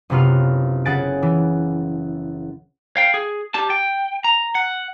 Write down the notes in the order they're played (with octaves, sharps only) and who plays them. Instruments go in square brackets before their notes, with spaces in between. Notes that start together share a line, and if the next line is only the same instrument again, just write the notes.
[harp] F#1 C3 B3 F4 F6
C#3 G#4 F#5 G#5 A6 D7
E3
[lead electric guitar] F5 G5
G#4
G4 A5
G5
A#5
F#5